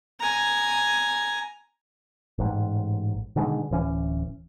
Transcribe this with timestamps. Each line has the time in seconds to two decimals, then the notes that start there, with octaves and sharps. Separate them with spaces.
0.20 G#5 A#5
2.39 A1 G#2
3.36 B2 D3 D#3 G#3
3.71 D1 E3 C#4